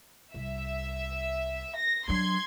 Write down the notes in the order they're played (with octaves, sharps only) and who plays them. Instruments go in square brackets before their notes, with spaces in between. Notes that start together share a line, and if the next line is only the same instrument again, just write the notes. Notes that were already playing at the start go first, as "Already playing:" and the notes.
[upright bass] C2 [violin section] E5
[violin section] A#6
[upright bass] F#3 D4 [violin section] C6 G#6